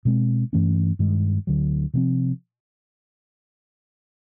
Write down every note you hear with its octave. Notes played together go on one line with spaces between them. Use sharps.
B2 G#3 C4
G2 E3 A3 C#4
G2 D#3 G#3
D2 D3 F#3
C3 F3 A3 C4